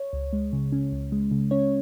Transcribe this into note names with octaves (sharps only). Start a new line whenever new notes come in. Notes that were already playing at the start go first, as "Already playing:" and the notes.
Already playing: C#5
C#2
G#3
C#3
C#4
C#2
G#3
C#3
C#4 C#5